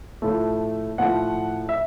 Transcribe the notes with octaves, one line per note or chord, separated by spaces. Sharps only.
A2 F3 A3
A2 F3 A3 F#5
E5